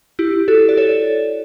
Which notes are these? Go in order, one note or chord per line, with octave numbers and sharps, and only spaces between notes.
E4 G4
F#4 A4
D5
A4 C#5